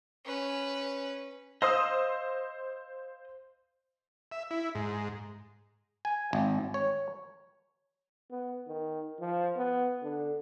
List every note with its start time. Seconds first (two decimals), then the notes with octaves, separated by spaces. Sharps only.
0.25 C#4 B4
1.62 C5 D#5 F5 C6 D#6 E6
4.32 E5
4.51 E4
4.75 G#2
6.05 G#5
6.33 G#1
6.74 C#5
8.31 B3
8.67 D#3
9.20 F3
9.57 B3
10.02 D3